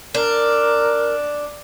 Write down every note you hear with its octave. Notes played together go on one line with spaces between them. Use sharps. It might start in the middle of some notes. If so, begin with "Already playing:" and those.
D4 A#4